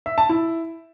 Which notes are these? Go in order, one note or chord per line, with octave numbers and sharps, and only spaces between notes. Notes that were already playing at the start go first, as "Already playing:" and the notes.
E5
A5
E4